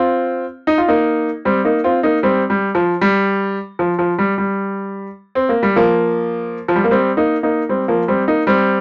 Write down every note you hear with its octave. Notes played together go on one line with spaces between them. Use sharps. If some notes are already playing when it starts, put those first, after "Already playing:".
Already playing: C4 F4
D#4
F4
A#3 D#4
G3 C4
A#3 D#4
C4 F4
A#3 D#4
G3 C4
G3
F3
G3
F3
F3
G3
G3
C4
A#3
G3
F3 A#3
F3
G3
A#3
G3 C4
A#3 D#4
A#3 D#4
G3 C4
F3 A#3
G3 C4
A#3 D#4
G3 C4